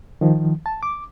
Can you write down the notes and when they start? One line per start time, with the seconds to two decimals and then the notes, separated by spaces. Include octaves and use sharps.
0.21 D#3 F3
0.66 A5
0.83 D6